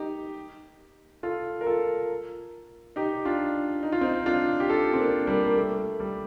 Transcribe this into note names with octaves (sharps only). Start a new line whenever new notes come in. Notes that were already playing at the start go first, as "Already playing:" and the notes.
Already playing: D#4 G4
F4 A4
A#4
F4 A4
D#4 G4
D4 F4
D#4
F4
C4 D#4
D4 F4
G4
F4 A4
C4
A#3 D4
G3 A#3
A#3
A3
G3